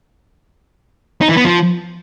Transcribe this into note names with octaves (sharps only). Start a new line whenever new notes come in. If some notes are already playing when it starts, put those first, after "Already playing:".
D#4
E3
B3
F3